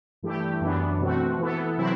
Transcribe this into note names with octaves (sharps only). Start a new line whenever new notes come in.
G2 E3 A3 E4 G4
F#2 E3 B3 D4
B2 A3 C4 F#4
E3 B3 E4 A4
C3 F#3 C4 E4